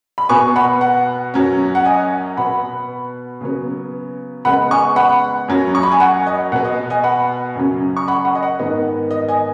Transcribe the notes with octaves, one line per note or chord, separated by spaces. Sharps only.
B5
B2 B3 G#5 C#6
F#5 B5
F#5
F#2 F#3 C#4
F#5
D#5 G#5
B2 B3 F#5 B5
C#3 F#3 B3
C#3 G#3 B3 F#5 B5
G#5 C#6
F#5 B5
F#2 F#3 C#4
C#6
B5
G#5
F#5
D#5
B2 B3 F#5
D#5
D#5 G#5
F#5 B5
F#2 C#3 F#3 C#4
C#6
F#5 B5
F#5 B5
D#5
F#5
G#2 D#3 B3 D#5
D#5
D#5 G#5